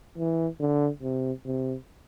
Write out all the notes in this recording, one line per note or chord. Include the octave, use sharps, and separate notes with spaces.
E3
D3
C3
C3